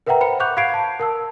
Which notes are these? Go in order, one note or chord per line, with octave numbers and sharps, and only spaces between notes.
A#4 B4 E5 F#5 G5 A#5
C5 B5 C#7
F#5 C#6 D6 F#6 G6 F7
F5 B5 G#6 C7 D7
A5
A#4 A5 E6